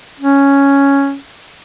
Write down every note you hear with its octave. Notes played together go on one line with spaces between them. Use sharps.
C#4